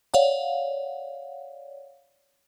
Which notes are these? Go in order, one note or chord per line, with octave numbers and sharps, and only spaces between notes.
C#5 D5 F5 F#5